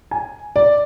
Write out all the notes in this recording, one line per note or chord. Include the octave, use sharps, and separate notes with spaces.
G#5
D5